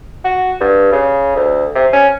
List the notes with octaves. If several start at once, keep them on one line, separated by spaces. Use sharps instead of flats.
F#4
G2
C#3
D2
C3
C#4